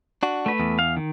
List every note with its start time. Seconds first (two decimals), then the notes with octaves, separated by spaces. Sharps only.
0.23 D4 F#4
0.46 A3 B4
0.60 E2
0.79 F5
0.97 D#3